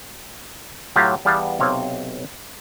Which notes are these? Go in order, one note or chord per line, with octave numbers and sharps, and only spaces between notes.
A2 F#3 F4 G4 A#5
E2 G3 B3 F5 A5
B1 C3 C4 C#5 F5